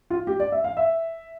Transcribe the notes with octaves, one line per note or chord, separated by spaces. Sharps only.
F4
G4
D5
E5
F5
E5